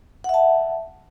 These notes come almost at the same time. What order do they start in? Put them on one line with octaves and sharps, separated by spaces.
F#5 E5 A5